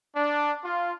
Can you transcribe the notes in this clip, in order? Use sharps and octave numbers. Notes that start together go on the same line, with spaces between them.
D4
F4